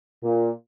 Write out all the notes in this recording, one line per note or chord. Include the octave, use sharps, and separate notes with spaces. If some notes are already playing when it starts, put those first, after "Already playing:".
A#2